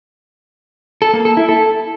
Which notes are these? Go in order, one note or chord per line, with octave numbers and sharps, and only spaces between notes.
A4
A#3
A4
E4
A4